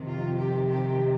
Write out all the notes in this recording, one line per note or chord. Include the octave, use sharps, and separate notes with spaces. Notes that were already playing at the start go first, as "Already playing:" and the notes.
Already playing: F2 C3 D#3
F4
G4
G4